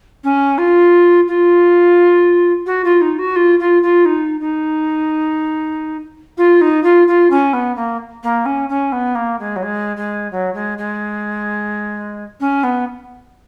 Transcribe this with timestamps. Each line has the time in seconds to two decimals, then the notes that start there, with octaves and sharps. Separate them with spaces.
0.23 C#4
0.58 F4
1.27 F4
2.66 F#4
2.84 F4
3.01 D#4
3.18 F#4
3.36 F4
3.59 F4
3.82 F4
4.05 D#4
4.40 D#4
6.37 F4
6.61 D#4
6.83 F4
7.07 F4
7.30 C#4
7.53 B3
7.76 A#3
8.23 A#3
8.45 C#4
8.69 C#4
8.92 B3
9.15 A#3
9.39 G#3
9.56 F#3
9.62 G#3
9.96 G#3
10.31 F#3
10.54 G#3
10.78 G#3
12.40 C#4
12.63 B3